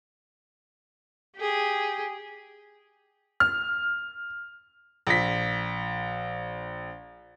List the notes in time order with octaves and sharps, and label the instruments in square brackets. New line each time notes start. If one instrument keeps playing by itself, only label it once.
[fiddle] G4 G#4
[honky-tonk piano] F6
[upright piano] A#1 B6